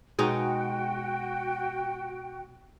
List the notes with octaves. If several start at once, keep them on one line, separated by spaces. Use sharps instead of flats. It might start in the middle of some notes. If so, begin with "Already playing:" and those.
B2 G#3 D#4 F#4 G5